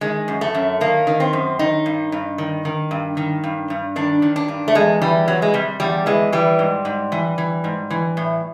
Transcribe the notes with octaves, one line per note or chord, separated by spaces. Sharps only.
D#3 G#3
F#2
A3
F#2
D#3 A#3
D#3
C4
F#2
D#3 D#4
G2
G2
D#3
D#3
G2
D#3
G2
G2
D#3 D4
D#3
D4
G2
A3
E2 G#3
E3 G3
E2 F#3
G#3
C3 G3
E2 G3
E3 G#3
E3 G3
G#2
G#2
E3
E3
G#2
E3
A2